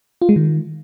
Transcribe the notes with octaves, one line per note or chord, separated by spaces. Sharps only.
F4
G#3
D#3